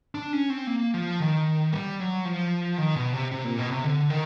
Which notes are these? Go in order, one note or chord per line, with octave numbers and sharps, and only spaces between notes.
D4
C#4
C4
A#3
F3
D#3
G3
F#3
F3
D#3
B2
C3
C3
A#2
B2
C3
D3
D#3